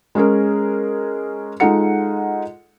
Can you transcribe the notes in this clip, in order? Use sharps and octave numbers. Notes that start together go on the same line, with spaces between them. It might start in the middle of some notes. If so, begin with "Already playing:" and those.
G#3 C#4 G#4 A#4
G#3 D#4 F4 A4 F#5 C#7